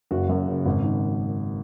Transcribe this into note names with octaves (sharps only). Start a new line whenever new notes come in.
F#1 F#4
F#2
C#3
G#1
D#3